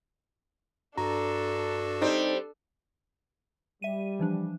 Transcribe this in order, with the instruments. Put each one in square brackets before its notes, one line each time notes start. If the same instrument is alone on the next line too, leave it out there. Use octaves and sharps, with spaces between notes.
[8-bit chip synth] G2 F#4 [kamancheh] D4 A4 [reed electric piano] A#5
[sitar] G3 C4 [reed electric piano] D#4
[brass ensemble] G3 [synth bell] E5 D#7
[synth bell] E3 F3 D4